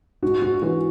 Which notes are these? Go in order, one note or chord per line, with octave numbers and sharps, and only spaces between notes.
G#2 F#4
F#4
E3 F#4